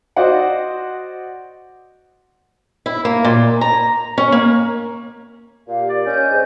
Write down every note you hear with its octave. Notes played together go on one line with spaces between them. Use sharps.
F#4 C5 D5 D#5 F#5
E4
A#3
A#2
A#5
C#4
A#3
A#2 G4 F5
D5
C#4 D#5 G#5 G6
G#2